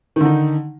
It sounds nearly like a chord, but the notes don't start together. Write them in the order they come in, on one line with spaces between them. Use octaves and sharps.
D#3 D3 D#4